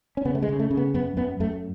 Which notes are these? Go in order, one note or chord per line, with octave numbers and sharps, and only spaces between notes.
C#4
C#3 B3
A3
G#3
C#3
A3
C#3
B3
F#2 B3
F#2 B3
F#2 A3